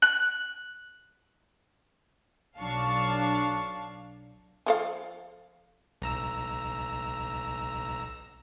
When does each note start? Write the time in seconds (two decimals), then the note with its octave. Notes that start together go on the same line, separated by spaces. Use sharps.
0.02 F#6
2.57 B1 F#3 D4 F5 A5 C#6
4.66 F3 A4 F5
6.02 B1 A#5 E6